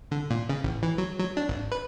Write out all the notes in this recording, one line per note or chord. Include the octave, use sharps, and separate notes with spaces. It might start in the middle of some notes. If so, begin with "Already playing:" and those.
D3
A#2
C#3
A1
E3
F#3
F#3
D4
G#1
B4